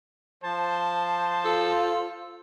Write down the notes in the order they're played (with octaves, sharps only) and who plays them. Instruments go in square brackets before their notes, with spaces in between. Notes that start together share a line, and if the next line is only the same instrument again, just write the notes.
[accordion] F3 A5 [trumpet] C5
[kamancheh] F4 [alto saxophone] A4